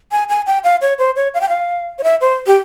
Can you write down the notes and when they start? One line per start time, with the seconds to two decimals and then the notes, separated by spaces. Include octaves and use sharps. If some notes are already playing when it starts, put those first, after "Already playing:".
0.12 G#5
0.29 G#5
0.47 G5
0.64 F5
0.81 C#5
0.99 C5
1.16 C#5
1.34 F5
1.41 G5
1.49 F5
1.99 C#5
2.03 E5
2.21 C5
2.47 G4